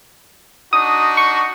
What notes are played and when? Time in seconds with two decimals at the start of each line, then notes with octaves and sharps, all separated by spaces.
0.73 D4 D#4 F#4 D#6
1.17 C#6